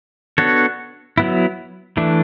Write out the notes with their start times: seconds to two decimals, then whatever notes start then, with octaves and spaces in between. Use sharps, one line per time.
0.38 B3 D4 F#4 A4 C#5
1.18 F#3 B3 E4
1.97 E3 A3 D4